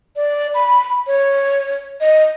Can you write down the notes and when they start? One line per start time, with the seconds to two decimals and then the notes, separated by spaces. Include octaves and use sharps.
0.16 D5
0.54 B5
1.07 C#5
2.01 D#5